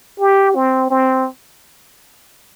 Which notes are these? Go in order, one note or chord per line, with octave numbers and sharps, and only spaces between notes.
G4
C4
C4